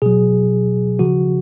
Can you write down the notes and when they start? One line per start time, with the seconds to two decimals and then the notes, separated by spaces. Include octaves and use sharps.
0.02 B2 F#3 G#4
0.99 C#3 F3 F#4